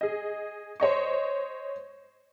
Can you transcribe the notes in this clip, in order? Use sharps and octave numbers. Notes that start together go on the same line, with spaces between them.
G#4 D#5
C5 C#5 D#5 C#6